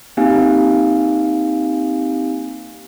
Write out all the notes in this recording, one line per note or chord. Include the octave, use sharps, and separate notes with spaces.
A#3 C4 D#4 G4 F5 G#5